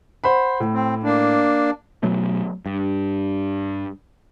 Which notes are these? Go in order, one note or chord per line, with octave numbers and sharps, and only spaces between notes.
C5 F#5 B5
A2
C4
A#3 D4
B2 F#3 A3
G2